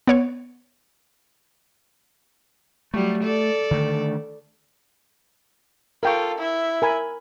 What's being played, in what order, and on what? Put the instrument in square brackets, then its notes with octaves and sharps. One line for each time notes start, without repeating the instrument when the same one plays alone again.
[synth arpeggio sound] B3 C#5 C#6
[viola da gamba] F#3 G3 [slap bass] A3
[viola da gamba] A4 D5
[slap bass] D3 D#3 A3
[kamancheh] F4 A4 [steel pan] A#4 G5 C#6
[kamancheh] E4 E5
[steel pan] A#4 G#5 B5